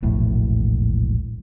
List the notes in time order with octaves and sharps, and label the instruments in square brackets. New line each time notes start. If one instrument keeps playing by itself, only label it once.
[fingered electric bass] E1 A#1 A2